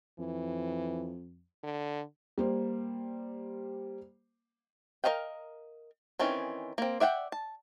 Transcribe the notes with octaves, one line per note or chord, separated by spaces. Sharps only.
F2 E3
D3
G3 A#3 C5
A#4 C5 D#5 F5 G5
D#3 E3 C4 C#4
A#3 C4
D5 E5 F#5 G5
A5